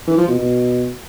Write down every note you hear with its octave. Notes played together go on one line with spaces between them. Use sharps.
E3
F3
B2
B2